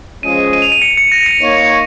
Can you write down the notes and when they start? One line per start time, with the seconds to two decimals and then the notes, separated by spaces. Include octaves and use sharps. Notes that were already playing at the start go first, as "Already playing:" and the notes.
0.23 F3 G#3 C#4 G#4 D#5 D#7
0.53 D#7
0.62 F7
0.72 D#7
0.82 C#7
0.97 C#7
1.12 A#6
1.26 C#7
1.40 A#3 D#4 C#5